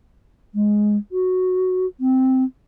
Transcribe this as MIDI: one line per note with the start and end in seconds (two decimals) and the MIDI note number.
0.55 0.97 56
1.12 1.86 66
2.00 2.44 60